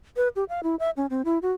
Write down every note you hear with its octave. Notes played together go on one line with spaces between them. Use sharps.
B4
G4
F5
E4
E5
C#4
C4
E4
F#4